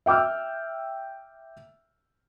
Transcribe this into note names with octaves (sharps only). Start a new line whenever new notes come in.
E5 G5 D6 E6 F6